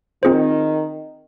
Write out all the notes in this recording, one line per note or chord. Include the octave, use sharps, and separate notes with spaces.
D#3 C4 F4 G#4 C5